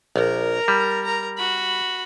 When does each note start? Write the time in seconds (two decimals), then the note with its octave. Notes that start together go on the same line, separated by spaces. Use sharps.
0.16 A#1 A#4 A#5
0.68 G3
1.04 A#4 A#5
1.37 F#4 B5